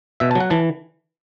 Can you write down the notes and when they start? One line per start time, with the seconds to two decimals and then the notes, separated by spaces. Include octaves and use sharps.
0.20 B2 E5
0.31 A5
0.35 F#3
0.40 F#5
0.50 E3 A5